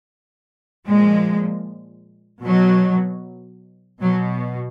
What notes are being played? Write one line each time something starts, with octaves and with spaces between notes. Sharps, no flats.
A#2 F3 G#3
B2 F#3
B2 F#3